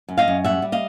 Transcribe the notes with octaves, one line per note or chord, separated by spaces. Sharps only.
F#2
D#5 F5
F#2
G3 E5 F#5
G3
D#5 F5